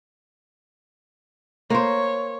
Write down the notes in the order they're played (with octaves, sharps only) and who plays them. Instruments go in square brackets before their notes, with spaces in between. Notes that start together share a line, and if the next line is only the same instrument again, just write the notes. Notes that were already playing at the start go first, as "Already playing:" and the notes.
[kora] A#3 C5 [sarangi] C#5